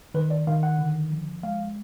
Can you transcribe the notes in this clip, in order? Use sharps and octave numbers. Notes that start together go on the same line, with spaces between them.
D#3 B4
D5
D#3 F5
F#5
D3
F3
G#3 F5